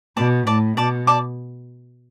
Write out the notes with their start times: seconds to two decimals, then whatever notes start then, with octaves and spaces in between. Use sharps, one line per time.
0.17 B2 D5 A5 D6
0.46 A2 D5 A5 D6
0.77 B2 D5 A5 D6
1.07 D5 A5 D6